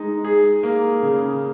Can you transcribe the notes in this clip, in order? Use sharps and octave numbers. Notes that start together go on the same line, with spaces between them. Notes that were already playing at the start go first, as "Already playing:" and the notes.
Already playing: G#3 D#4
G#4
A#3
C#3